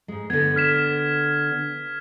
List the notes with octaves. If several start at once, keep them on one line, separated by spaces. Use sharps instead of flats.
G#2 G#3
D3 B3 G#6
F6 B6 E7